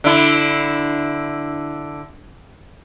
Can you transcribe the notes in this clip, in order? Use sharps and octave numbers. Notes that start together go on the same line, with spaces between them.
D3 E4